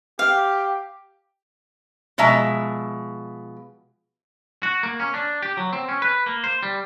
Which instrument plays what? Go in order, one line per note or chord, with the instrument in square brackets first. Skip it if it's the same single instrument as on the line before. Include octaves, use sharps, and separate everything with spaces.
[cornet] G4 [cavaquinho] F5
[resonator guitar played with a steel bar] B2 F3 G#3 E5 A#5
[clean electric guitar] F#4
A#3
C#4
D4
G4
F#3
C4
C#4
B4
A#3
C5
G3